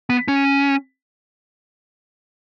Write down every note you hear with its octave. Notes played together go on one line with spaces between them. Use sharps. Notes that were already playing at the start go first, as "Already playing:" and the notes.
B3
C#4